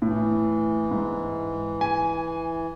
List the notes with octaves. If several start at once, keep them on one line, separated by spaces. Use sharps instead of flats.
A2 E3
G#2
G#5